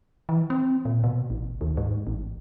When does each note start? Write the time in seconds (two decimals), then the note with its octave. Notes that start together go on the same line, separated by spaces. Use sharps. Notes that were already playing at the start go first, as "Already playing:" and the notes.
0.29 E3
0.50 C4
0.85 A#2
1.04 B2
1.30 A1
1.61 D#2
1.77 G#2
2.07 A1